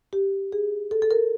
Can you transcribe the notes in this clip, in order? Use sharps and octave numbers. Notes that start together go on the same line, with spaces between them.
G4
G#4
A4
A4
A#4